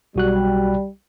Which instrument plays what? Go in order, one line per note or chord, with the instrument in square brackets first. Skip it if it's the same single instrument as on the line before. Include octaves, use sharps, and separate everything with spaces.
[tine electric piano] B1 F#4 F#6 [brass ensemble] G3